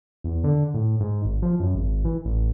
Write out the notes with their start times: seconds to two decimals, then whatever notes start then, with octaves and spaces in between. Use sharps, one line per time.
0.24 E2
0.44 D3
0.74 A2
1.01 G#2
1.25 G#1
1.42 F3
1.60 F#2
1.75 G#1
2.05 E3
2.25 A1